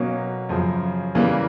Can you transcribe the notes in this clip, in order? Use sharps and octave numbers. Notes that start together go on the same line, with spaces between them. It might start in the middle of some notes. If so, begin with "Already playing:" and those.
Already playing: B2 F#3 A#3 C#4
F#2 C#3 F3
C#3 E3 G3 A#3